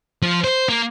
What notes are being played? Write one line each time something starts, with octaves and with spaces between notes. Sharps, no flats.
F3
C5
A#3